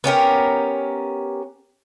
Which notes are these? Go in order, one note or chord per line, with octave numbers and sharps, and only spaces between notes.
B3 C#4 G4 A#4